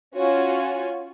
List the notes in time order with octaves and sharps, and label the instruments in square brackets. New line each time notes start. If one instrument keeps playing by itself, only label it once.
[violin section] C#4 F4 F#4 C#5 G#5